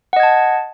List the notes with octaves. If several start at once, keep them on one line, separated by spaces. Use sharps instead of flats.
D#5 F#5 A5 G#6